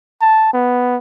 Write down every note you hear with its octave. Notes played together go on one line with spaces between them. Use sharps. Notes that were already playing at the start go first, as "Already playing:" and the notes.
A5
B3